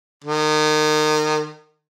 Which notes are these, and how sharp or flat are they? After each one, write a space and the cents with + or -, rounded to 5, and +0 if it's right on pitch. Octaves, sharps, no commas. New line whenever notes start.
D#3 -30